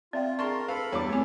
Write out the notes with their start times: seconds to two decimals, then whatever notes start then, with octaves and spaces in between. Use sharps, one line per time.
0.13 C4 F4 D5 E5 G5
0.39 G#4 A#4 A5 C6 C#6
0.68 A4 B4 F5 B5
0.93 E2 G3 C#5 D6
1.09 A3 C4 B4 C#5 G#5